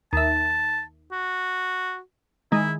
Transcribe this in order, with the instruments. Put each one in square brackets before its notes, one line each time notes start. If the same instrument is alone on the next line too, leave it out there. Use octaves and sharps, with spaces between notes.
[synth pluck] D#2 E5 [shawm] A5
[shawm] F#4
[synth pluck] D#3 G#3 [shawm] E4